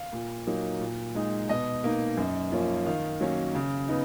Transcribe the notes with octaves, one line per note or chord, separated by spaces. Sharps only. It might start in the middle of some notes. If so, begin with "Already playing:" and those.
Already playing: F5
A#2
F#3 A#3 D#4
A#2
G#3 D#4
B2 D#5
A#3 D#4
F#2
F3 A#3 C#4
D#3 F5
F#3 A#3 C#4
C#3
B3 D#4